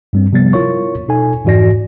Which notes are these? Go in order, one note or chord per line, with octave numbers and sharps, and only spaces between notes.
G2 G3 C4
C3 F3 G3 B3 A6
E4 F4 A#4 C#5 C#6
B2 D#4 A4 G#5
F2 G#2 E3 F#4 D5 A#6